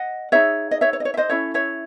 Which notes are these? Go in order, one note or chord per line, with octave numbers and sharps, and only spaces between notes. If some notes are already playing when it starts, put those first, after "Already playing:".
Already playing: D#5 F#5
D#4 G#4 C#5 E5
D#5
C#5 E5
C#5
D#5
C#5
E5
C5 D#5
C#4 E4 A4 C#5 E5
C#5 E5